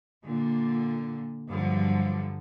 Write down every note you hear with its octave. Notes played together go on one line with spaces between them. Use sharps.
A#2 D3
G2 D3 F3 F#3